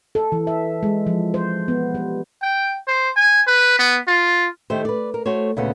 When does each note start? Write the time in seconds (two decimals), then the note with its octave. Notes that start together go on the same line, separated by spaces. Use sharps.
0.15 A4
0.32 E3
0.47 E5
0.83 G#3
1.07 F3
1.34 C5
1.68 B3
1.94 G3
2.43 G5
2.87 C5
3.16 G#5
3.47 B4
3.79 B3
4.08 F4
4.70 D#3 A3 G4 A4 C5
4.85 B4 D5
5.14 A#4
5.26 A3 F#4 C5 C#5
5.57 D2 A#2 C#3 B3 A4 F#5